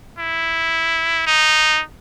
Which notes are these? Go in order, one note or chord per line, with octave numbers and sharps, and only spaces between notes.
E4
D#4